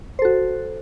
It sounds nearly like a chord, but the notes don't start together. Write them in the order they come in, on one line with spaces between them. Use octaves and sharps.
C5 A4 F#4